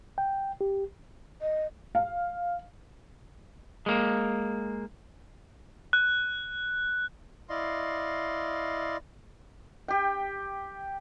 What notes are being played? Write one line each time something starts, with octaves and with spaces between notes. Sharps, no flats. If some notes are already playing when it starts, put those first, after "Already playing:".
G5
G4
D#5
F5
G#3 A#3
F#6
E4 D5 D#5 F5 C6
G4 G5